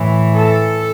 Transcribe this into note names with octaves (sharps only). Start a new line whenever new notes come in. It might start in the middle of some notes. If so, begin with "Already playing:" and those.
Already playing: A2 E3
A4